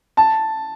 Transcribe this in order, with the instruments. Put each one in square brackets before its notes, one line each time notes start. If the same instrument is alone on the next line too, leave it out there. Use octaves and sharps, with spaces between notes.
[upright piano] A5